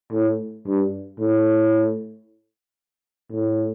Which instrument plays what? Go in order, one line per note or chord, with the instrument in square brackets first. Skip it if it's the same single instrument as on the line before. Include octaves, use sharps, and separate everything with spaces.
[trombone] A2
G2
A2
A2